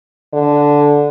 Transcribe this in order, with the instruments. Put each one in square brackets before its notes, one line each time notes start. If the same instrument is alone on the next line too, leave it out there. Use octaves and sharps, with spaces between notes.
[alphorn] D3